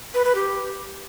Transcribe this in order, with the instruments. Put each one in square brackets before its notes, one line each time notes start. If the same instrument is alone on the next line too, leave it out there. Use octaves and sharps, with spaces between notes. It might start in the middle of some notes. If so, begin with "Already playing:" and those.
[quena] B4
B4
G4